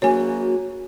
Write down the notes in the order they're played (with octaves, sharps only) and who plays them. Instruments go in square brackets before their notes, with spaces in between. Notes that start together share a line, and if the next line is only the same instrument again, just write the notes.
[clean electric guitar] A#3 G#4 A#4 [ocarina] F#4 [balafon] C#5 G#5